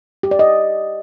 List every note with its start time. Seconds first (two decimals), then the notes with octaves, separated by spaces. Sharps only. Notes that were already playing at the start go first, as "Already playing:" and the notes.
0.23 G4
0.31 D5
0.39 D#5